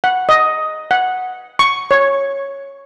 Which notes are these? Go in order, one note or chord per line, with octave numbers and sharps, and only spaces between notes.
F#5
D#5
F#5
C#6
C#5